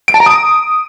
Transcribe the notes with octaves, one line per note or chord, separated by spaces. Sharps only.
D7
A5
A#5
D#6